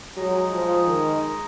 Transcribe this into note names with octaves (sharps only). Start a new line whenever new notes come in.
F#3 G#3 D#4 G#4 D#5
F3
D#3